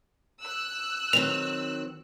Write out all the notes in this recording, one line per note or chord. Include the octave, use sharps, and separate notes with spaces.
E6 F#6
D#3 F#3 C4 F7